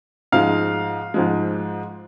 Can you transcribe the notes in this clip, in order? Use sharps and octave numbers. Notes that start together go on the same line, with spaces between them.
G#2 F3 G#3 F5
G#2 F3 G#3